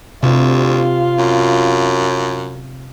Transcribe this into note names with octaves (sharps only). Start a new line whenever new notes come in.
D2 C3 F4
F#2